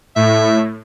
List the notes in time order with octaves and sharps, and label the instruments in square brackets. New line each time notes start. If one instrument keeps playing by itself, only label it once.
[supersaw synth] A2 [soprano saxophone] E5